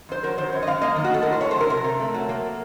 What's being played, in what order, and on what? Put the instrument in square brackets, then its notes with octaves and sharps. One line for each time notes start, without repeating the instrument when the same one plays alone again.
[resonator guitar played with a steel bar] F2 C5
F#3 A#4
D#3 C5
F#2 C#5
D#5
F#2 F5
A#3 D#5
D#3
F#4
A2 A4
A2 A#4
C5
A3 C#5
C5
F#3 A#4
C3 A#4
C3
A3
F#3
A#3